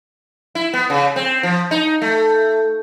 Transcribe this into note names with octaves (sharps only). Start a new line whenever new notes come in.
E4
B3
C#3
C4
F3
D#4
A3